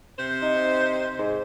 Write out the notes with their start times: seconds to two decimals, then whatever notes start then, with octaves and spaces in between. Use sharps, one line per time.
0.19 C3 C5
0.42 D#4
1.19 G#2